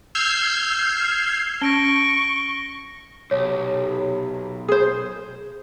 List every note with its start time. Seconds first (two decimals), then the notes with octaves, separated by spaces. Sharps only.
0.15 E6 F6 G6 G#6 C7
1.62 C#4 C#6 A#6 D7 G7
3.31 B1 C3 C#5
4.68 G#4 C5